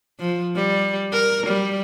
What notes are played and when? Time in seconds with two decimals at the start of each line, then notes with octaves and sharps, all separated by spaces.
0.19 F3
0.56 G3
1.12 A#4
1.47 G3